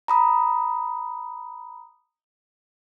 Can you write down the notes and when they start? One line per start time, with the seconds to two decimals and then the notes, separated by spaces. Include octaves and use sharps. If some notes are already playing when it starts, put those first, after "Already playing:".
0.08 A#5 B5 D#6